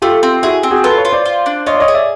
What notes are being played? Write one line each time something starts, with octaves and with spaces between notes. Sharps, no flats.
A3 F4 G4
C4
E4 F#4 G#4
C4
F#4 G#4
F4 A4 B4
B4 C#5
F4
C5 D5
F4
D4
F4 C#5 D#5
D5
C#5 D#5
G#4
D5 E5